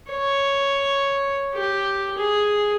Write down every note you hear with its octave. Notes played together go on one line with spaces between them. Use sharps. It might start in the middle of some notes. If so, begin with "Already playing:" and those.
C#5
G4
G#4